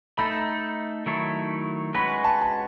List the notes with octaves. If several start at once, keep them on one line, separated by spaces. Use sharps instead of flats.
A3 D#4 A4 B5
D#3 F#3 A3 E4 A4
G#3 C#4 F#4 B4 B5
A5
A5